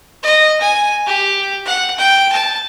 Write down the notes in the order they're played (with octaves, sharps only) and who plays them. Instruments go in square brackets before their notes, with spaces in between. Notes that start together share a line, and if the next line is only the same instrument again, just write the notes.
[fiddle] D#5
G#5
G4
F#5
G5
A5